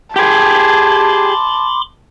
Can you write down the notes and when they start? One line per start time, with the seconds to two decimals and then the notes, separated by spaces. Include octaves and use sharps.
0.16 G4 G#4 A5 B5 C6 D6